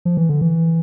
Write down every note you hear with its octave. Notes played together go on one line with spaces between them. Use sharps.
F3
E3
D3
E3